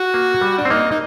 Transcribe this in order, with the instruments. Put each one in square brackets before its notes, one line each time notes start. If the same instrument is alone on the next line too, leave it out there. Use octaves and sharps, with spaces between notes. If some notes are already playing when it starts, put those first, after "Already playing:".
Already playing: [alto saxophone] F#4
[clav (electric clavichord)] A#3
G3
[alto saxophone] D4
[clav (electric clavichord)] C4
[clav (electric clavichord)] A#3 [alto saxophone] D#4
[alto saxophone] D#4